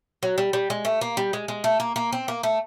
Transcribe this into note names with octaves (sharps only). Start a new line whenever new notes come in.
F#3
G3
G3
G#3
A3
A#3
G3
G#3
G#3
A3
A#3
A#3
C4
A#3
A3